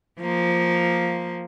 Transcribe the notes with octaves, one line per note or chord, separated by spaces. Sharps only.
F3 A#3